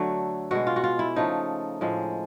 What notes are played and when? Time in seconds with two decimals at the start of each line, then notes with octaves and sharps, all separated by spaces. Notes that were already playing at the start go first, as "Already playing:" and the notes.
Already playing: D3 F#3 A3
0.51 B2 G#3 F#4
0.67 F4
0.76 F#4
0.84 F4
0.99 E4
1.16 C#3 F3 A3 D#4
1.81 A2 F3 G#3